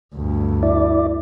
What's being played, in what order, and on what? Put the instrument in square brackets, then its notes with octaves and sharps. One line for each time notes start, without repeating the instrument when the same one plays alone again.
[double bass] D2 G2
[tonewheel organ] E4 D5